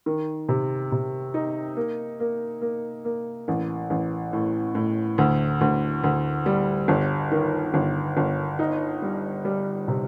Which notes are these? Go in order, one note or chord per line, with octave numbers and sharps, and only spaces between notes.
D#3
C3
C3
D#4
A#3
A#3
A#3
A#3
A1
A1
A2
A2
D2
D2
D2
G3
G1
D#3
G1
G1
D#4
G3
G3
C3